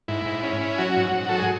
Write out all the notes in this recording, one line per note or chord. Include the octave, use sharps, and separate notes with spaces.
G#2 E4
G#2
C#4
C#4
F#3 F#4
G#2
G#2
F#3 A4
G#4